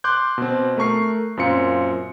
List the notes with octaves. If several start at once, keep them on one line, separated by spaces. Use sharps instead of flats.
C6 D6 F#6 G6
B2 C4
A3 A#4 C#6 C7
F#2 A#2 C4 F4 C#7